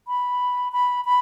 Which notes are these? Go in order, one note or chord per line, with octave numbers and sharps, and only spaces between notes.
B5
B5
B5